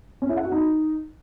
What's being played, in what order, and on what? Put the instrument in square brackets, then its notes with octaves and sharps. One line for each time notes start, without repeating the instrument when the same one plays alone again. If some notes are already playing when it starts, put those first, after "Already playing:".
[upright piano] C#4
E4
F#5
F#4
D#4